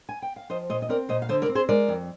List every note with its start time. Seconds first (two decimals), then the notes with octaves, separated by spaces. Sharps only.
0.09 G#5
0.22 G5
0.36 F5
0.50 F3 C5 D#5
0.70 A#2 C5 D#5
0.82 D#5
0.89 C4 A#4 D5
1.09 A#2 C5 D#5
1.22 F5
1.29 D3 C5 D#5
1.42 A#4 D5
1.49 C4
1.55 G#4 C5
1.69 G#3 A#4 D5
1.88 F2